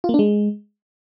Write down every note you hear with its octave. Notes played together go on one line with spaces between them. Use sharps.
F4
A#3
D4
G#3